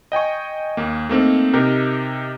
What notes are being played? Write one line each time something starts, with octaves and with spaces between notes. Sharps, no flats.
D#5 G5 G#5 C#6
D#2 A#3
A3 A#3 C4 D#4
C3 D#4 G4 A#4